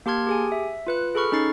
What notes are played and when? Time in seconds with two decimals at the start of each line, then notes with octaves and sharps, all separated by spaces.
0.06 A#3 G4 A5 C6 F6 G#6
0.27 G4 G#4 G#5
0.52 E5
0.87 F4 B4 F#6
1.15 G#4 A4 B5 C#6 F6
1.32 C#4 D#4 F6 A6 C7